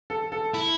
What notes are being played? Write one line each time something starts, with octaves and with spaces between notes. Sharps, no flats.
A4
A4
E4